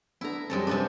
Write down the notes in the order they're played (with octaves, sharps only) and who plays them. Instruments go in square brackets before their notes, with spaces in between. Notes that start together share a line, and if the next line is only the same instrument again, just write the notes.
[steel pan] B3 D4 A4 [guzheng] E4 A#5
[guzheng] F#2 G#3 A4 [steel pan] G3 C4
[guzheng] C3 B3 D4 [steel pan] G#3 C#4 A4